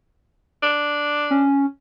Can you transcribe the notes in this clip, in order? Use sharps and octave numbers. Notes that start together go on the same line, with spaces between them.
D4
C#4